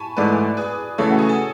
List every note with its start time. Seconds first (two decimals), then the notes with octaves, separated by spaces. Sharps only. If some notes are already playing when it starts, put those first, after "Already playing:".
Already playing: G#5 A5 B5 C#6
0.17 G#2 E3 A3 B4 D5
0.57 G#4 B4
0.98 C#3 E3 A3 A4 C#5
1.09 F#4
1.19 G#4
1.29 A4